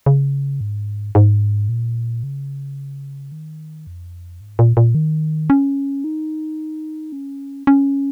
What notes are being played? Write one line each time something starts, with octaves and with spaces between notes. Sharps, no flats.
C#3
G#2
G#2
A#2
C#3
D#3
F2
G#2
A#2
A#2
D#3
C#4
D#4
C#4
C#4